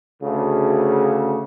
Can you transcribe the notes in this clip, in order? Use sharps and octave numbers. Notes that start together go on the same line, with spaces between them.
D2 C#3